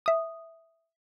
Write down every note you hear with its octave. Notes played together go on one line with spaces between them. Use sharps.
E5 D#6